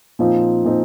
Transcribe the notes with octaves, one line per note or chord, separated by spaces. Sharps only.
A#2 F3 C4 D#4
A#2 F3 C4 D#4